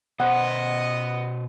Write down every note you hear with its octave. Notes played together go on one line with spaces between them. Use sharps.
B2 B3 C5 D#5 F#5